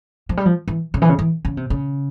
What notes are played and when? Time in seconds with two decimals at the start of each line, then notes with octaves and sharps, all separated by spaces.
0.29 F3
0.37 G3
0.46 F3
0.68 E3
0.94 C#3
1.02 E3
1.09 C#3
1.19 E3
1.45 C#3
1.57 C3
1.70 C#3